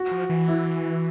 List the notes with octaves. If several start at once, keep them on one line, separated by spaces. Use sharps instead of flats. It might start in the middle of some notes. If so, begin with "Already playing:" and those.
Already playing: F#4
F3
E3
E4